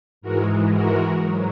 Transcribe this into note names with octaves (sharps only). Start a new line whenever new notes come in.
G#2 E3 G#3 F#4 A#4
F#4 A#4
G#2 F#3